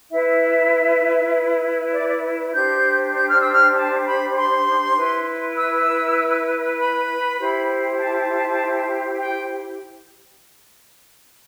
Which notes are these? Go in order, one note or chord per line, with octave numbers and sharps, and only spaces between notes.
E4 B4 E5
D5
D5
D4 G4 C5 G6
G6
F6
E6
F6
A5
B5
C6
E4 B4
E6
B5
E4 G4 C5
A5
G5